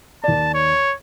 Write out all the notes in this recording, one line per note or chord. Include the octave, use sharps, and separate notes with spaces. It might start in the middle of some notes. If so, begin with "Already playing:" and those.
D#2 D5 A5
C#5